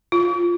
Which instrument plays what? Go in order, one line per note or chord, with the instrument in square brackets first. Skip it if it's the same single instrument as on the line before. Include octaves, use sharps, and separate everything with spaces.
[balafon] F4